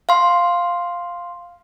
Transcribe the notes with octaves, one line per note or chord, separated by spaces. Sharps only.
F5 C6